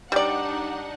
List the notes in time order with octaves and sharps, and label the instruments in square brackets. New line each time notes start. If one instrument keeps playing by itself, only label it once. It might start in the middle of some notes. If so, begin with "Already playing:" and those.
[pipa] G3 D5 [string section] D4 D#4 F#5